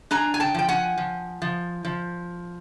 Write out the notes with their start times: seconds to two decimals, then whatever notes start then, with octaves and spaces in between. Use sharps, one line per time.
0.11 D4 G#5 A#5
0.34 G#5
0.40 G5 A5
0.55 F3 G5
0.69 F#5 G#5
0.98 F3
1.42 F3
1.85 F3